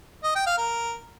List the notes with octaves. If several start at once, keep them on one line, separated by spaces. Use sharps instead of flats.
D#5
G5
F5
A#4